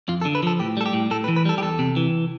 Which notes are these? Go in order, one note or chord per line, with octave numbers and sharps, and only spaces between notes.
F2 F4
A4
D3
B4
F3 A4
A2 G4
G3 A4
G4
A2
A2 A4
B4
E3
B4
G3 A4
G4
E2 A4
C3
E3